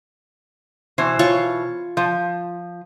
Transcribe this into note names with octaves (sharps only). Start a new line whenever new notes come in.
B2 E3 C5
F4 C#5 C#6
F3